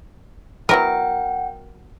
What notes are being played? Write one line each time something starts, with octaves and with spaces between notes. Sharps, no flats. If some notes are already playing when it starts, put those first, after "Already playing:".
F#3 B3 E4 A#4 F#5 G5